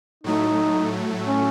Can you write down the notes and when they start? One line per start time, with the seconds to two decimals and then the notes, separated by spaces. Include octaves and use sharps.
0.23 A2 F#3 A3 D#4
1.26 C#4